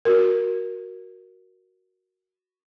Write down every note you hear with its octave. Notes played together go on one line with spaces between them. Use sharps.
F#4 A#4